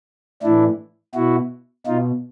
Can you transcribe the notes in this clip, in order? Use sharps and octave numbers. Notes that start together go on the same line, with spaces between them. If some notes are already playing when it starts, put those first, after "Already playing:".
A2 E3 D4 E4
B2 E4 F#4
B2 D#4 F4